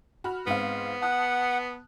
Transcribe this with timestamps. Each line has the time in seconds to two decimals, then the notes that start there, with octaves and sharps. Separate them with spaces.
0.24 F#4 B5 F6
0.47 G#2 B3 C4 F5
1.02 F#5 A5 D#6 F#6